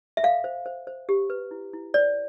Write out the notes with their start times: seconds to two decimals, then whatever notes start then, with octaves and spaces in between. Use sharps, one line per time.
0.17 E5
0.23 A4 F5
0.44 C5
0.66 C5
0.87 C5
1.09 G4
1.30 B4
1.51 E4
1.73 E4
1.94 C5 D5